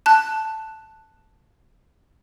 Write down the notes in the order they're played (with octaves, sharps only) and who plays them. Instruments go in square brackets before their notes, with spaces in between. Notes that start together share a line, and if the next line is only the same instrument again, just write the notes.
[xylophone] A5 F#6